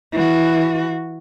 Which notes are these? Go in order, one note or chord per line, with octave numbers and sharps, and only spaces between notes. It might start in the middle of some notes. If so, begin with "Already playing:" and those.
E3 F#4